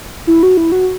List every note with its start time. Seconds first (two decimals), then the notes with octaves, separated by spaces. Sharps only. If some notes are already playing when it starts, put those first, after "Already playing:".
0.27 E4
0.43 F#4
0.57 E4
0.72 F#4